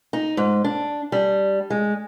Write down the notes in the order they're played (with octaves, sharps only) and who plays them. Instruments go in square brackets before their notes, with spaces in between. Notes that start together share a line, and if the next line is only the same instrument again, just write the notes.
[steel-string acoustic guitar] D#4
G#2
D4
G3
G#3